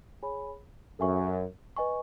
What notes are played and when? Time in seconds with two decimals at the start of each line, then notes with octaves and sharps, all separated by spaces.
0.23 G#4 C#5 G#5 B5
0.99 F#2 A4 E5 G#5 C#6
1.77 B4 D#5 G#5 C#6